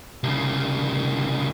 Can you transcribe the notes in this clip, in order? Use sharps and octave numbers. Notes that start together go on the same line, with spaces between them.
C2 C#3